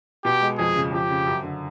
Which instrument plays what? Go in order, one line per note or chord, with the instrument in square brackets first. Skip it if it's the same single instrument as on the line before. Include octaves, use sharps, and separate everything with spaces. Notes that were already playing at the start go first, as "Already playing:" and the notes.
[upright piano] B2 [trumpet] G4
[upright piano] G#3
[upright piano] F2 [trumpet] G#4
[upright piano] C#3
[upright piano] F2 [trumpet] G4
[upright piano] C#3
F#2
D3